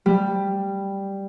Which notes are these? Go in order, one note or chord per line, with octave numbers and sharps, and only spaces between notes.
G3